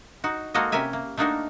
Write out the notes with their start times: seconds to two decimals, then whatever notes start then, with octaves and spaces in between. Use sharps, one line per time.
0.24 D#4 F#4
0.54 G#3 A#3 F#4 A4 A#4 D#5
0.72 C3 C#4 G4 A#4 E5 G#5
0.93 A#3
1.17 A3 A#3 D4 D#4 F#4 A#4